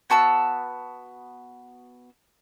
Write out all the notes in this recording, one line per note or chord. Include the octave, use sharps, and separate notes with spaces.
B3 F#4 A5 E6